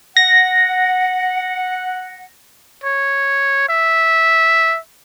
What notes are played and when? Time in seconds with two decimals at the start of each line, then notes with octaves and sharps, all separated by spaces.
0.17 F#5 A#6
2.84 C#5
3.69 E5